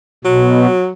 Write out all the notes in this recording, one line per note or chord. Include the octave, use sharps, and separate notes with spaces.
B2 F#3